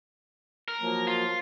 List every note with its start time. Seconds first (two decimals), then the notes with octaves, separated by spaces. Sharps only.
0.68 A#4
0.81 F3 F#3 A#3
1.07 F4